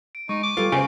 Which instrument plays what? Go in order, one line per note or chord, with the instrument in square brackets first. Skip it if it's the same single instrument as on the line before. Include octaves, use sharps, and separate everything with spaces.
[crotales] D7
[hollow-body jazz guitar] G#3 [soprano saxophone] D#4 [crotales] C#6
[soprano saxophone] D6
[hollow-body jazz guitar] G3 A4 B4 [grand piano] F4
[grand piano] C#3 [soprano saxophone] B3 [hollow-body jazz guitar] C5 D#5 G#5